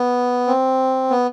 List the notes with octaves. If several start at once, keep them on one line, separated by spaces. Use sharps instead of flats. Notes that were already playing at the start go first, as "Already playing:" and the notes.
Already playing: B3
C4
B3